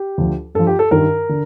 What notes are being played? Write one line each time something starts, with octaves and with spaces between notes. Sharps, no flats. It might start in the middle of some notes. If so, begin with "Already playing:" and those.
Already playing: G4
D2 D3 F3
G2 F3 A4
G4
A4
G2 D#3 A#4
D3